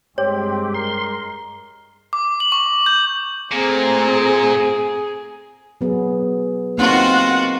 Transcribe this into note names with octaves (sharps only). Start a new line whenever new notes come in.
G2 G#3 C4 G4 C#5
A#4 C6
D6
F#7
C#6
G6
A#2 A3 C4 G#4 A#5
F#3 B3 G#4
A#3 C4 D#4 F4 F#4 F#5